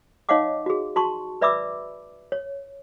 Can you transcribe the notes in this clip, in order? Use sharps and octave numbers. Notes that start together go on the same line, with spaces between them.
D#4 C#5 D#5 F5 F#5 D6
F#4 G#4
F#4 A5 C6 C#6
B4 D5 E5 B5 D6 E6
C#5